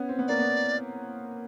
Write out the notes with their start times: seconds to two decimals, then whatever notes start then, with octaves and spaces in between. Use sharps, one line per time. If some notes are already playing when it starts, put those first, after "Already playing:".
Already playing: B3 C#4
0.09 C4
0.19 B3
0.28 A#3 D5
0.39 B3